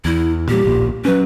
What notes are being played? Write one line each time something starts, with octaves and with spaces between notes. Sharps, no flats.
E2 E4
A#2 F3 G3 G4
D1 A#1 A#2
F#3 C#4 B4